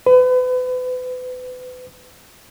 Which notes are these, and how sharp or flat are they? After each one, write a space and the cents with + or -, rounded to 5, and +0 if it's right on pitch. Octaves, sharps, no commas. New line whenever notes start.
B4 +35